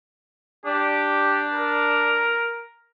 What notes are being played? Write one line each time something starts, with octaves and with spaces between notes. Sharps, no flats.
D4 G4
A#4